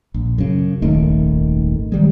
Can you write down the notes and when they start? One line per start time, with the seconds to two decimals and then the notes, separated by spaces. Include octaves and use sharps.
0.14 A#1
0.38 F#2 C#3
0.82 D#1 G#1 D#3 A3
1.92 D#3 G3 G#3